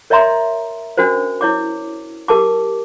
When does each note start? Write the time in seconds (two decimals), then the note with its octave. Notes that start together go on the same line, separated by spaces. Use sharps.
0.10 A#4 C#5 D#5 E5 A#5 C6
0.97 C#4 D4 F#4 A#4 C5
1.41 E4 C#5 D6
2.28 G4 A#4 A5 D6